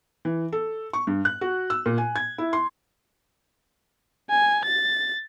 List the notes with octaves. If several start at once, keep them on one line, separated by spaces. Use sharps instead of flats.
E3
A4
C#6
G2
F#6
F#4
E6
A#2
G#5
G#6
E4
C6
G#5
A6